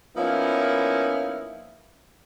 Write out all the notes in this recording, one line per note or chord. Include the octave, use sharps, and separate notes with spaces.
F3 A#3 B3 C#4 D#4 E4